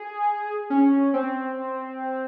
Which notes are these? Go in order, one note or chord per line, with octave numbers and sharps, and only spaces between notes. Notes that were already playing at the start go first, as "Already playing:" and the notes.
Already playing: G#4
C#4
C4